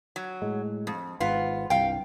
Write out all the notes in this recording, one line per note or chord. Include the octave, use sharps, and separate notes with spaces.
F#3
A2 G#3
F2
G#1 G#2 B3 F4
C2 G2 F5 G5